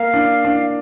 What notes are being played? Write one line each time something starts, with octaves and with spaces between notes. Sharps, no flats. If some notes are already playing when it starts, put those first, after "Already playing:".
Already playing: A#3 F5
D4
D4